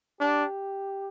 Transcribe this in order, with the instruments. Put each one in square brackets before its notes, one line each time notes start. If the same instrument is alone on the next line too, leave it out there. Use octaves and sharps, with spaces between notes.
[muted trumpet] D4 [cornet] G4